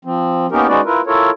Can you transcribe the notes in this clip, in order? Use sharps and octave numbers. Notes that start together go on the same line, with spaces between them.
F3 C4
A#3 B3 C#4 D#4 G4 A#4
G#3 C#4 D#4 F#4 B4 D5
E4 F4 A#4 B4
E4 F4 A4 A#4 C#5